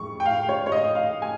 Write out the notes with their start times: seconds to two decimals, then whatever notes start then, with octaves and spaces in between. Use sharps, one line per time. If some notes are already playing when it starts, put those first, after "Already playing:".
Already playing: F2 G#3 C#6
0.20 G5
0.26 F5
0.49 C#5
0.66 C#5
0.72 D#5
0.95 F5
1.22 G#5